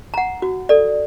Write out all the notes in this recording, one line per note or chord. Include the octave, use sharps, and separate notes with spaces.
F#5 A#5
F#4
A4 D5